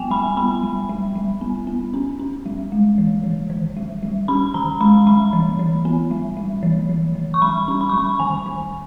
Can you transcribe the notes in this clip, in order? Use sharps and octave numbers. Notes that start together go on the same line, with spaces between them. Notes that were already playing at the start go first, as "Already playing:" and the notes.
Already playing: G3 B3 G5 G#5
G3 B5
B3 B5
G3
G3
G3
B3
B3
C#4
C#4
G3
G#3
E3
E3
D#3
G3
G3
C#4 B5
D#3 A#5
G#3 B5
G3 B5
E3
E3
B3
G3
G3
E3
E3
E3
C#6
G3 B5
C#4
B5
C#6
G3 B5
D#3 G#5
D#3